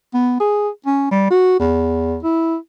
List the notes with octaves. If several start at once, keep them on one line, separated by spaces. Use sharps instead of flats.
B3
G#4
C#4
G3
F#4
E2
E4